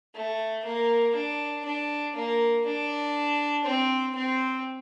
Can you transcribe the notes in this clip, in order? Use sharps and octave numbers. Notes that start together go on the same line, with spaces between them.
A3
A#3
D4
D4
A#3
D4
C4
C4